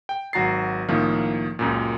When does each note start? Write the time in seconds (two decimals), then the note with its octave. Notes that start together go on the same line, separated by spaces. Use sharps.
0.09 G5
0.33 G#1 F#3 F#4 A#5 A6 C7
0.88 C2 A2 D#3 F3 A#3
1.59 C#2 F#2 A#2